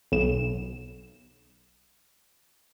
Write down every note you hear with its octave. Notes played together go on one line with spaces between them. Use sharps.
B1 E7